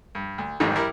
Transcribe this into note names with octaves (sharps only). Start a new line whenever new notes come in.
G2
D2
A1 F2 G#2 D#3 G3
G3 E4 A#4